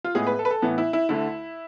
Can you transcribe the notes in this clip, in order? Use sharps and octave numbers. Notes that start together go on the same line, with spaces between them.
F4
A2 G#3 B3 G#4
B4
A4
B4
A4
A2 E3 B3
E4
E4
D2 D3 A3 E4